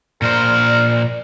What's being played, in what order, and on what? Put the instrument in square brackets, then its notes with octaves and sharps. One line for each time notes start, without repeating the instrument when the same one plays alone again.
[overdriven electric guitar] A#2 C5 [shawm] A#4 [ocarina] D5